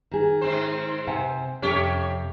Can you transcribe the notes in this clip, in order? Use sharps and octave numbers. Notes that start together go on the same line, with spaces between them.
D#3 G#4
G#2 C4 C5
C3 F#5 G#5
F2 C3 C#4 G4 C#5